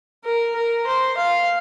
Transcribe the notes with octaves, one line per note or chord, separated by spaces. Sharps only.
A#4
A#4
C5
F5